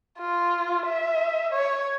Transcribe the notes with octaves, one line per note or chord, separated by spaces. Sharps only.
F4
E5
C#5